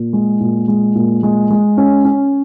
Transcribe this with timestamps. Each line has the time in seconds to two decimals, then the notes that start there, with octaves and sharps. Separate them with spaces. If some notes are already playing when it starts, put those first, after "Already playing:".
Already playing: A#2
0.13 G#3
0.40 A#2
0.68 G#3
0.95 A#2
1.23 G#3
1.51 G#3
1.77 C#4
2.05 C#4